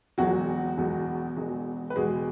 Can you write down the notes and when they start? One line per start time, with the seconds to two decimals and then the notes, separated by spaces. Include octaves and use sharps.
0.18 E1 E2 B2 F#3 G#3 F#4
0.78 E1 E2 B2 G#3
1.36 E1 E2 B2 G#3
1.90 B4
1.96 E1 E2 B2 G#3 G#4